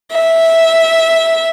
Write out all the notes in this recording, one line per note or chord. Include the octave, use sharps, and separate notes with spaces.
E5